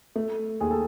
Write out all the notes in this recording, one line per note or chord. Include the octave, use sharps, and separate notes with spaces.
A3
D#2 G#4
A4